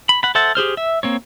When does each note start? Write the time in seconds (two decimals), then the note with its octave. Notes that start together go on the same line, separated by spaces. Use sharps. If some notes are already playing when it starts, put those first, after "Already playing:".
0.09 B5
0.23 F#5 B5
0.35 A4 C5 E5 F#5 A5
0.55 G4 G#4 C5 F6
0.77 E5
1.03 A#3 C4 C#5